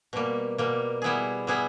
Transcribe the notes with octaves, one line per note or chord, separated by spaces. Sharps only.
B2 G3 A#3
B2 G3 A#3
G3 B3 E4 G#4
G3 B3 E4 G#4